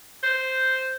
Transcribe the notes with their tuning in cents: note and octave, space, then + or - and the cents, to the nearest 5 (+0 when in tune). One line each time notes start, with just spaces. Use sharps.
C5 -5